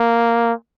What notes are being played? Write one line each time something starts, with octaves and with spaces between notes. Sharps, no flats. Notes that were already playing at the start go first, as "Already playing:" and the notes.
Already playing: A#3